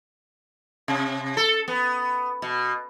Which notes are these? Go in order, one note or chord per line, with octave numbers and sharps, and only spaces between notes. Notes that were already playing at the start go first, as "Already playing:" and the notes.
C3
A4
B3
B2